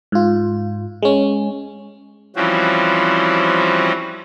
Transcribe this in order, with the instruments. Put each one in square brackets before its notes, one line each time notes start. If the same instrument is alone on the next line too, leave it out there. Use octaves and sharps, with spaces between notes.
[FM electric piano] G#2 F4
G#3 C#4
[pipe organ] E3 F3 G3 C4 C#4 F#4